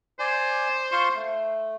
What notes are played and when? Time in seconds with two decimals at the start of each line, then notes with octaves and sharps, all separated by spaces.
0.19 C5 D5 G#5
0.92 F4 C6 C#6
1.15 A3